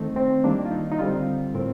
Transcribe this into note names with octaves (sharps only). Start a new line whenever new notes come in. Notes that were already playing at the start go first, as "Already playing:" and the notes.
Already playing: D#3 A3 C4 D#4
C4
D#3 G3 A#3 D4
F4
D#4
D#4
D3 G3 C4 F4
A2 A3 C4 A#4